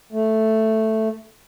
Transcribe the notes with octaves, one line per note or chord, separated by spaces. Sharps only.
A3